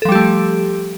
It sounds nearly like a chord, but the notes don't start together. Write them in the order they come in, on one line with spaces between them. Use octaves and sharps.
A4 F3 G3 G4 A3